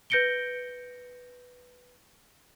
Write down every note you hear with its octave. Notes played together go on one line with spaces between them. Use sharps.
B4 G6 A#6 C#7 D7 G7